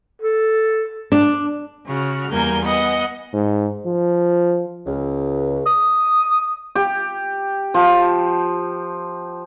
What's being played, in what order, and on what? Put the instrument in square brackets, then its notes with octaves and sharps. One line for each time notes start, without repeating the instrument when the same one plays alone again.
[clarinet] A4
[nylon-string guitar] D4
[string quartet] C#3 F#4 F6
E2 G3 A#3 A#4 G#5 G6
B3 D#5 F#5 G#5
[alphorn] G#2
F3
[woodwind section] C#2
D#6
[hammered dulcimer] G4
F3